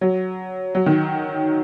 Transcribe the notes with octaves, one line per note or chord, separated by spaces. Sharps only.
F#3
F#3
D#3